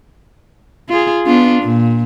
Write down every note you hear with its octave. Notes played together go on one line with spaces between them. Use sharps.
F4 G#4
B3 D4 F4
A#2